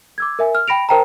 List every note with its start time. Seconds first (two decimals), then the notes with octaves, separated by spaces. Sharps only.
0.18 D6 E6 G#6
0.39 A#4 E5 G#5
0.55 F6
0.68 G5 B5 A#6 D7 F7
0.89 A#4 C5 G5 A5 A#5